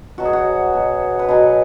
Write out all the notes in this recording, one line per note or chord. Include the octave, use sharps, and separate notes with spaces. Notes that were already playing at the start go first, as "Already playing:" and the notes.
B2 F#3 F#4
G#4
F#4
B2 F#3
B4
B2 F#3 G#4